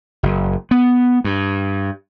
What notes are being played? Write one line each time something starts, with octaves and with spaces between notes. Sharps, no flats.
F#1
B3
G2